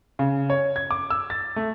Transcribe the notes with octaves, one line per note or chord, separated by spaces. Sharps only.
C#3
C#5
G#6
D6
E6
A6
A3